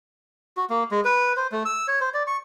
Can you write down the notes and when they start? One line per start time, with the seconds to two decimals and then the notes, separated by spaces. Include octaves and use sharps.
0.57 F#4
0.70 A#3
0.91 G#3
1.05 B4
1.37 C5
1.52 A3
1.65 E6
1.88 C#5
2.01 C5
2.14 D5
2.27 C#6